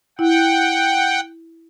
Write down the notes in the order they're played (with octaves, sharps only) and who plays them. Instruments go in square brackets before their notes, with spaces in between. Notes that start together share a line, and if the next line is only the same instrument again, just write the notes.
[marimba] E4 [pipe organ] F#5 G5